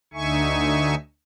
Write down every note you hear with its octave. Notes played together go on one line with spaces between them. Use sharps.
D2 D3 D#4 E5 G#5 C#6